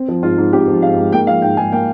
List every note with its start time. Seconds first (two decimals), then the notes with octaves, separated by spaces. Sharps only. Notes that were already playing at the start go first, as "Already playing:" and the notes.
Already playing: C4
0.08 F3
0.23 G#2 F4
0.37 G#2
0.52 C4 G4
0.68 F3
0.82 G#2 F5
0.98 G#2
1.12 A#3 G5
1.27 F3 F5
1.42 G#2 G5
1.57 G#2 G#5
1.72 A#3 G5